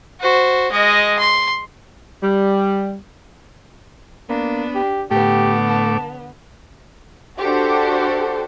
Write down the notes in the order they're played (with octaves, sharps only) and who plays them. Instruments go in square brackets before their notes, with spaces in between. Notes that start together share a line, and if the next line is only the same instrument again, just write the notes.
[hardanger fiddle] F#4 C5
G#3 D#5
C6
[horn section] G3
[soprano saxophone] A#3 [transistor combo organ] B3 [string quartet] D4
[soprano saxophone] G4
[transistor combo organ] A2 A3 D6 [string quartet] D3 B3 [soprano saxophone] G4
[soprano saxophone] A5
[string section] D4 G4 [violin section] F#4 A4 C5